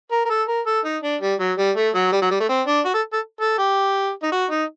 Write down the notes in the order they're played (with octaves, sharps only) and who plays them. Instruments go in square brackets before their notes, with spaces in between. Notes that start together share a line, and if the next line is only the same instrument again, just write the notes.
[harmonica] A#4
A#4
A4
A#4
A4
D#4
D4
G3
F#3
G3
A3
F#3
G3
F#3
G3
A3
C4
D4
F#4
A4
A4
A4
G4
D#4
F#4
D#4